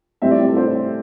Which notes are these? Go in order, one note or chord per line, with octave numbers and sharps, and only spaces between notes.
A2 G3 C4 E5
D5
G4
A4
C5